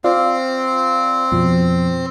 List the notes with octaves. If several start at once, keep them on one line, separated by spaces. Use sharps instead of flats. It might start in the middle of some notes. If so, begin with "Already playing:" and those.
C4 F4 D5 F5
F2 B2 F3